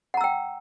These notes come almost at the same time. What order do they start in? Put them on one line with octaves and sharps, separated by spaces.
F#5 A#5 E6 G5